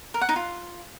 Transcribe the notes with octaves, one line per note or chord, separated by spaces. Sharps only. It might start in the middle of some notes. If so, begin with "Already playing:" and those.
A#4
F#5
D#4
F4